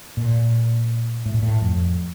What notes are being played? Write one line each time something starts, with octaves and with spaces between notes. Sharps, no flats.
A#2
A2
A#2
A2
F2